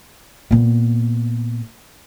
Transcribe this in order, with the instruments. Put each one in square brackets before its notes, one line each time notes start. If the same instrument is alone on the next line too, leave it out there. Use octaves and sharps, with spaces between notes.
[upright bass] A#2 B3